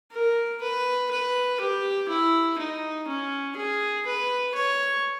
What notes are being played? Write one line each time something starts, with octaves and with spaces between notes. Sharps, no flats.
A#4
B4
B4
G4
E4
D#4
C#4
G#4
B4
C#5